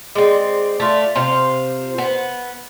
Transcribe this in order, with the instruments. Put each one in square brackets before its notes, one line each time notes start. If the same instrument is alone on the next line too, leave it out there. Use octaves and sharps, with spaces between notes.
[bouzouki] G#3 C4 [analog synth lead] D5
[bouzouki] A3 F4
[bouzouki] C3 F4 [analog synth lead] C5
[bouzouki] B3